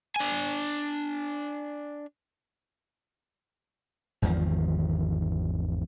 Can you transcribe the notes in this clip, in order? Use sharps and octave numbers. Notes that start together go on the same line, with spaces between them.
D4 G#5
G#1 E2 D#3 F3